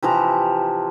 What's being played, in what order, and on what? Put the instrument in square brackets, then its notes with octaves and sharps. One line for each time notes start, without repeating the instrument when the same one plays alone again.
[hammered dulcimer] C3 E3 F3 A#5